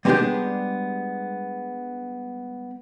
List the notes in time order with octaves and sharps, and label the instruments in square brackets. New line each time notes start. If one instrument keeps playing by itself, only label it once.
[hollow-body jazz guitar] G3 G#3 B3 C4 D4 G4